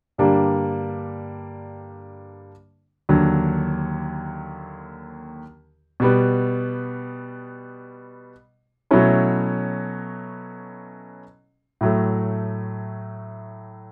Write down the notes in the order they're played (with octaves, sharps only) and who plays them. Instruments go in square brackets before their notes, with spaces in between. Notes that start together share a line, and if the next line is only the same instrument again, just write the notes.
[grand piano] G2 D3 G3 A#3 D4
D#2 D3 F#3
B2 G3 B3
B2 F#3 A3 C#4 E4
A2 F#3 A3